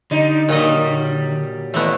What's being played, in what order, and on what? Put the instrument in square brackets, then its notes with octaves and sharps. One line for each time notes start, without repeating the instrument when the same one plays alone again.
[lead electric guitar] D3 [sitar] G3 D#4
[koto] A#2 D#3 D#5 [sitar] F#3 G3
[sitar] D#2 [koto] A3 B3